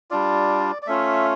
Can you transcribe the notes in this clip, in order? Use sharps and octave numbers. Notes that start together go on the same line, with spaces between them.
G3 D4 F4 D5
D5
A3 C#4 F4 E5